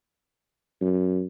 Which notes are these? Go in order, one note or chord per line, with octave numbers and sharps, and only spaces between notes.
F#2